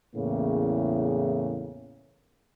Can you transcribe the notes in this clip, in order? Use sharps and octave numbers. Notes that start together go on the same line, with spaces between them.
E2 A2 C#3 A#3